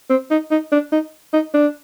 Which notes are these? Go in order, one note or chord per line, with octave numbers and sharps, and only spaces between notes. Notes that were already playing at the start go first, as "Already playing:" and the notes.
C4
D#4
D#4
D4
D#4
D#4
D4